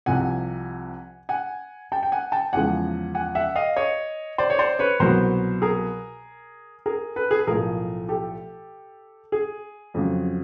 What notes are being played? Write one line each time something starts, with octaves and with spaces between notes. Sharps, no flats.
C2 C3 F3 F#5 G#5
F#5 G#5
G5 A5
G5
F#5 G#5
G5 A5
E2 C#3 F3 G#3 F#5 G#5
F#5 G#5
E5 F#5
D#5 F5
C#5 D#5
C5 D5
C#5
C5 D5
B4 C#5
C2 B2 F#3 B3 A#4 C5
G#4 A#4
G#4 A#4
A4 B4
G#4
A4
B1 A2 F3 A3 G#4 A#4
G4 A4
G#4
F2 C#3 F#3